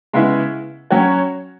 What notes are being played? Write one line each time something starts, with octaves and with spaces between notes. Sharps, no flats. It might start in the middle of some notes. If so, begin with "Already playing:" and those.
C#3 G#3 B3 E4
F#3 C#4 F#4 C#5